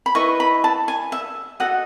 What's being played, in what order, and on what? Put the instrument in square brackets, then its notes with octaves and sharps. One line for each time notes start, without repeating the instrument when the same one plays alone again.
[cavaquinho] B5
E4 B4 D#5 C#6
B5
A5
G#5
E5
F#4 A4 D#5 F#5